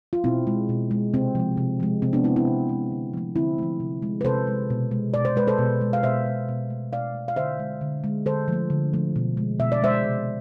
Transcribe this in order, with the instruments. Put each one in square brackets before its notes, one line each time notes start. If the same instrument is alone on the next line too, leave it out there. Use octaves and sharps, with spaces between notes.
[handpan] F4
B2 C4 E4
G#3
B2
G#3
C3 C4
F3 G#3
C3
F3 G#3
C3 C4
B3 D4
G#3 C4 E4
C4 E4
C3
G#3
D3
F3 A3
D3 C4 E4
F3 A3
C3
G#3
B4
C3 A4 C5
G#3
B2
G#3
B2 D5
C5
G#3 B4
A4 C5
B2
G#3
F5
B2 C5 E5
G#3
B2
A3
B2 D5 F5
A3
F5
D3 C5 E5
G#3
D3
G#3
D3 A4 C5
F3 A3
D3
F3 A3
B2
G#3
B2 E5
D5
G#3 C5 E5
C3